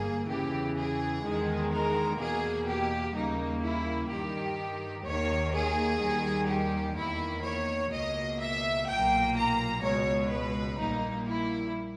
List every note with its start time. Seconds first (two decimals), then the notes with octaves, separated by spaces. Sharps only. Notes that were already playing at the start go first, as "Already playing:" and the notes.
Already playing: G1 G2 G3 A#3 G#4
0.29 E2 C#3 E3 G4
0.78 G#4
1.24 E2 D#3 G#3
1.72 A#4
2.20 E2 B2 A#3 G#4
2.68 G4
3.15 D#2 C#3 G3 A#3 D#4
3.63 E4
4.10 G2 D#3 G3 G4
5.06 D#2 D#3 A#3 C#5
5.54 G#4
6.02 D#2 D#3 G3
6.49 G4
6.97 E2 D#3 A#3 E4
7.44 C#5
7.93 C#2 B2 A#3 D#5
8.40 E5
8.88 B1 A#2 A#3 G5
9.35 A#5
9.83 C#2 B2 G#3 C#5
10.30 B4
10.79 A#1 A#2 G3 A#3 D#4
11.26 E4